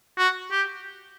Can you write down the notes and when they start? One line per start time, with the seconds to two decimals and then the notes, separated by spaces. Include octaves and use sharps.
0.18 F#4
0.51 G4